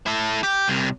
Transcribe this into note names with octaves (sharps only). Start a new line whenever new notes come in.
E4 A4
G4
C2 C3